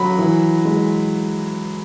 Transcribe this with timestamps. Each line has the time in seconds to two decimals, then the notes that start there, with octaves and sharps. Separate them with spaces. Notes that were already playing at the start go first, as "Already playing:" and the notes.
Already playing: F#3 B5
0.19 E3
0.65 G#3